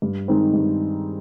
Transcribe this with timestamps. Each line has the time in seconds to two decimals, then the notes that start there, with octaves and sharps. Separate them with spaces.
0.02 G2
0.28 D#3 G#3 C4 D#4
0.54 G2